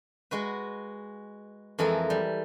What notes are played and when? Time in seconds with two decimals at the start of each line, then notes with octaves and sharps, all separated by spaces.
0.31 G#3 F#4 B4
1.79 F2 E3 G#3 A4 A#4
2.10 G3